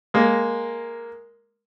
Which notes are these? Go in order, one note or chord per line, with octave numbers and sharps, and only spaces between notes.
G#3 A#3